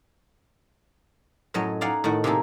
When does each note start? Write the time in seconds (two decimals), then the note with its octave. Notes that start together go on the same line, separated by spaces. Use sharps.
1.54 F#2 A2 F#3 C#5 D#5
1.81 D#4 D5 F5 F#5 G#5
2.04 A2 D#3 F#5
2.24 C3 A#3 D#4 G#4 A4